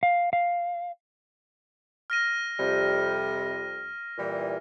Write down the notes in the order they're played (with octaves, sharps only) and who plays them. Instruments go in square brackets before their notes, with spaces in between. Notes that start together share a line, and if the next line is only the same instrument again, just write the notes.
[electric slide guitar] F5
F5
[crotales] F6 A#6 D#7
[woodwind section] F2 C3 G3
A#2 E3 G3